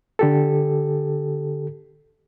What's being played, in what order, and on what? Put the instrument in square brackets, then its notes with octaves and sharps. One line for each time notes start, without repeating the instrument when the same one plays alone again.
[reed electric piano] D3 G4 A4